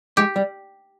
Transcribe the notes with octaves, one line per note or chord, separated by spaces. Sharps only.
G#3 G4
G3